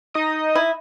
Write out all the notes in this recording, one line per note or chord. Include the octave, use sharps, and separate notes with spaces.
D#4 D#5 D#6
E4